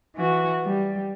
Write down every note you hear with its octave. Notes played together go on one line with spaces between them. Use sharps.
E3 F#4
G3